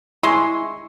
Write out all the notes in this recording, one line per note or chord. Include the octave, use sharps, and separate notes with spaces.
G#3 E4 G#5 C6 C#6 E6